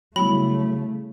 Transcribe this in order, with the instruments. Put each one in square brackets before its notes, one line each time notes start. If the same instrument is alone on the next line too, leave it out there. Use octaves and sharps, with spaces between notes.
[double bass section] C#3 A3 [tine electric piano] F#3 [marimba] G3 B3 E4 [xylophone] B5